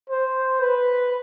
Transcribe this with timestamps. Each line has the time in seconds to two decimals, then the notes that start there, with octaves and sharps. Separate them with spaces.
0.10 C5
0.61 B4